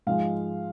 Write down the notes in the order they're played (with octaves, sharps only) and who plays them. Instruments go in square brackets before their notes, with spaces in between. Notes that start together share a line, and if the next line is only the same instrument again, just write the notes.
[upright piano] G#2 F3 G#3 F5